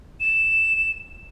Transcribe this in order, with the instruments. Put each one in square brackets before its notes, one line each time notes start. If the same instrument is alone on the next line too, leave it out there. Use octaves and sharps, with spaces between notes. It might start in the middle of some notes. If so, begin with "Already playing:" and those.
[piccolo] E7